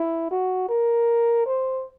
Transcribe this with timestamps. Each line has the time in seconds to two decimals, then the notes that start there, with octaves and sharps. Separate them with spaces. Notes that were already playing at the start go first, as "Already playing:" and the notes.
Already playing: E4
0.31 F#4
0.69 A#4
1.46 C5